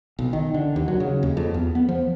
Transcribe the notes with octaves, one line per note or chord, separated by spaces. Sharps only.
B1
D#3
D3
D#2
F#3
C#3
D#2
F2
E2
B3
F3